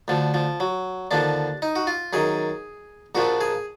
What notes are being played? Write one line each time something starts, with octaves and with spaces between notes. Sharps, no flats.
D2 D3 F3
F3
F#3
D#2 D3 F3 D4
D#4
F#4
F4
F#2 D#3 G#4
A#1 A#2 F3 F#4
G#4